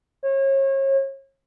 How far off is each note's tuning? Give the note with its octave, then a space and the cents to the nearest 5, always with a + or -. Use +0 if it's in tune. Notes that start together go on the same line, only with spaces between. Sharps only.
C#5 -35